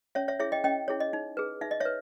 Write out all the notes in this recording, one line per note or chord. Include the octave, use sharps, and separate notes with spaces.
C#4 C#5 E5
C#5 E5
E4 G#4 C#5 E5
D#5 G5
C#4 D#5 G5
E4 G#4 C#5
D#5
D#4
G#4 B4
D#4 E5
D#5
B4 C#5 E5